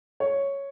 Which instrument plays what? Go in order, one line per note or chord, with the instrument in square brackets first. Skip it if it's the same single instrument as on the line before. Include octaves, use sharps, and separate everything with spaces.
[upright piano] C#5